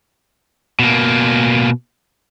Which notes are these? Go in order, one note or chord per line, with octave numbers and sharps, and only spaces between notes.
B2 A#3